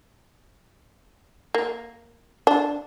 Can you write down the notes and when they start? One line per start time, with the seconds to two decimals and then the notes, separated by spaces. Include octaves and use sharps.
1.55 A#3
2.47 D4